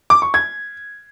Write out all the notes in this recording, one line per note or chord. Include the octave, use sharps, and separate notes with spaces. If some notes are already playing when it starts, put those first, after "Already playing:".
D6
C#6
G#6